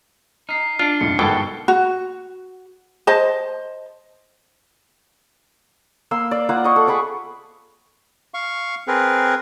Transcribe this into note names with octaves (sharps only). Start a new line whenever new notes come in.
D#4 F6 C7
D4 F4 F6
B1 F2 A2 C#7
G1 G#2 B2 E3 A4 A#4 G5
F#4
C5 D#5 A5
A#3 C6 E6
D5
A#3 F4 F#5
D#5 C#6
A4
G#4 B5 C#6 D6
F5 C#6
C4 G#4 A#4 B4